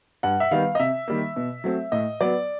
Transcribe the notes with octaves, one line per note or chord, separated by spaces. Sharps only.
G2 F#5
E5
D#3 G3 B3 F5
D#5
C3 E5
D#3 G3 A#3
B2
F#3 A3 C4
A2 D#5
F#3 B3 D5